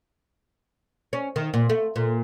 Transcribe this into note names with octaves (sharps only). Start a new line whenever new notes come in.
C#4
D#3
A#2
A3
A#2